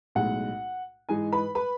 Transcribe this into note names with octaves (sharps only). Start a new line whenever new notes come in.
B1 A2 G#3 F#5
G#2 E3 G#3 D#4 G#4 G#5
B4 B5
B4 B5